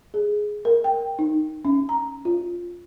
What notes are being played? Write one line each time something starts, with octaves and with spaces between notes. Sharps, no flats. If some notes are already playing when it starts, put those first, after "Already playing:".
G#4
A#4
G5
D#4
C#4
A#5
F4